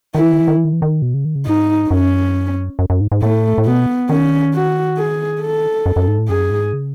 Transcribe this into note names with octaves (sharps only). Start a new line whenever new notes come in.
D#3 E4
E3
D#3
E3
D#3
E3
D#3
E3
D#3
B2
C#3
D#3
C#3
G#2 D#4
F#2 C#4
F#2
F#2
G#2
G#2
A2 A3
A2
B2 B3
D#3 C#4
F#4
G#4
A4
F#2
F#2
G#2
A2
F#2 G#4
G#2
C#3